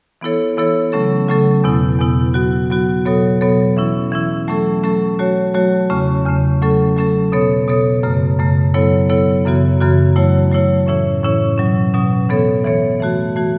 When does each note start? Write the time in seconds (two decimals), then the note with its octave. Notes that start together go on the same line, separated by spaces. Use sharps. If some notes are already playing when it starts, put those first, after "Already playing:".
0.21 E3 B3 E4 A4 C#5
0.57 E3 B3 E4 A4 C#5
0.92 C#3 F#3 A3 C#4 A4
1.28 C#3 F#3 A3 C#4 A4
1.64 E2 B2 B3 E4
1.99 E2 B2 B3 E4
2.34 F#3 B3 F#4
2.70 F#3 B3 F#4
3.05 B2 F#3 B3 A4 C#5
3.41 B2 F#3 B3 A4 C#5
3.77 E3 C#4 E4
4.12 E3 C#4 E4
4.48 F#3 A3 C#4 A4
4.83 F#3 A3 C#4 A4
5.19 F#3 A3 F#4 C#5
5.54 F#3 A3 F#4 C#5
5.90 E2 C#3 A3 C#4
6.25 E2 C#3 A3 C#4
6.62 F#3 A3 C#4 A4
6.96 F#3 A3 C#4 A4
7.32 B2 B3 A4 C#5
7.68 B2 B3 A4 C#5
8.03 F#2 C#3 A3
8.39 F#2 C#3 A3
8.74 F#3 B3 E4 A4 C#5
9.10 F#3 B3 E4 A4 C#5
9.46 F#2 C#3 E3 B3 F#4
9.80 F#2 C#3 E3 B3 F#4
10.16 F#3 A3 E4 C#5
10.51 F#3 A3 E4 C#5
10.87 A2 E3 C#4 E4 C#5
11.23 A2 E3 C#4 E4 C#5
11.58 B2 F#3 C#4
11.94 B2 F#3 C#4
12.29 E3 B3 A4 C#5
12.65 E3 B3 A4 C#5
13.00 E3 A3 F#4
13.36 E3 A3 F#4